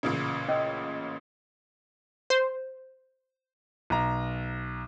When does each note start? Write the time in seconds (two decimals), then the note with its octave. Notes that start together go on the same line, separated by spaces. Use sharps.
0.03 A1 A#2 C#3
0.48 C#4 D#5 E6
2.30 C5
3.90 B1 A#5